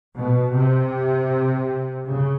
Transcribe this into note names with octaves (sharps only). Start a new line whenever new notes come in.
B2
C3
C#3